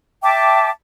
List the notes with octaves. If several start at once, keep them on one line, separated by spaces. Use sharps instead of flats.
E5 G5 A5 D6